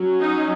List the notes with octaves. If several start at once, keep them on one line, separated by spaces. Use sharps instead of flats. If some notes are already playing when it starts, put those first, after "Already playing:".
Already playing: F#3 C#4
D#4